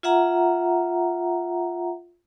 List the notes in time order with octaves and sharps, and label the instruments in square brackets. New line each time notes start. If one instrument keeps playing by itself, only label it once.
[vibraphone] F4 E5 F#5 A#5